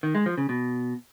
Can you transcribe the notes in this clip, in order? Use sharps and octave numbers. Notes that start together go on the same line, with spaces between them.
D#3
G#3
F3
C#3
B2